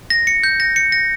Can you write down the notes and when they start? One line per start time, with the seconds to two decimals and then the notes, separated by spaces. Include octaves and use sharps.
0.10 A#6
0.27 C#7
0.44 G6
0.60 A#6
0.76 C#7
0.92 A#6